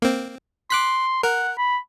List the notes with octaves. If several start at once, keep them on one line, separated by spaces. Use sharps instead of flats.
A#3 C4
C6 D6 F#6 B6
A#4 F#5
B5